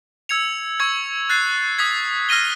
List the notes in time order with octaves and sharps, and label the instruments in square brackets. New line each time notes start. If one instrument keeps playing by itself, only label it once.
[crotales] E6 G#6 C#7 F7
C#6 E6 G#6
F#6 A6 C7
D#6 G#6 B6
F6 A#6 D#7 G7